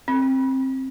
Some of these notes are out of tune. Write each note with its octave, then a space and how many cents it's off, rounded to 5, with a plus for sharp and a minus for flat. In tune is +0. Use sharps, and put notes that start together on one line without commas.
C4 +15